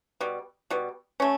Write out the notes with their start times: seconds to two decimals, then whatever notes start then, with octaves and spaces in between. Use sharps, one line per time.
0.20 B2 G3
0.70 B2 G3
1.20 A3 C#4